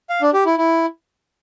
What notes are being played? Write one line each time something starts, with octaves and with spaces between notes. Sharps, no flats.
F5
D4
G4
E4
E4